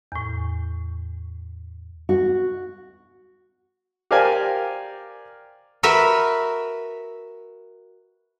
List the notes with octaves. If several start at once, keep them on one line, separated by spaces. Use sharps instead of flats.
E2 A2
F#4
G4 A#4 C5 D5 F5 G#5
F#4 A#4 B4 E5